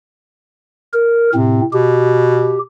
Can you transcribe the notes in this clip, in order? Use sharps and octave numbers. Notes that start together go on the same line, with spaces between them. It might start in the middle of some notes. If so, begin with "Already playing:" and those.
A#4
A2 C3 C4
B2 G4